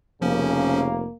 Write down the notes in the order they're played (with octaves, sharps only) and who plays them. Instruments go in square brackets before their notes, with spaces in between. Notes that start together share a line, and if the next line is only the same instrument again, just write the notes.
[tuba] F1 [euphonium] C#3 [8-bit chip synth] F3 C#4 [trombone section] A#3